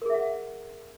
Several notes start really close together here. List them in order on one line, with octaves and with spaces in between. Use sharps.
A#4 G#4 E5 F#5